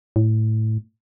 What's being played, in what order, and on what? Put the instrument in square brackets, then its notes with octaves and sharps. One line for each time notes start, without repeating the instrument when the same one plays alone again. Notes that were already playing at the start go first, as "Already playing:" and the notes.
[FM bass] A2